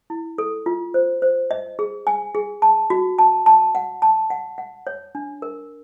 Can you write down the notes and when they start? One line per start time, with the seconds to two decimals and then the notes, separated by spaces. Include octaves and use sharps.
0.10 E4
0.38 A4
0.66 F4
0.94 C5
1.22 C5
1.51 D#5
1.79 G#4
2.07 G#5
2.35 G#4
2.62 A5
2.90 F#4
3.19 A5
3.46 A5
3.75 F#5
4.02 A5
4.30 F#5
4.58 F#5
4.87 C#5
5.15 D4
5.42 A#4